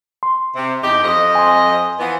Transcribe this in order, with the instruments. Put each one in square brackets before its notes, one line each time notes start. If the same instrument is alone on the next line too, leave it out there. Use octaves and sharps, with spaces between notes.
[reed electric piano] C6
[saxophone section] C3
E2 D#4 G4
F2 D#5
[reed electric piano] G#5 C6
[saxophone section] E3 F3 B3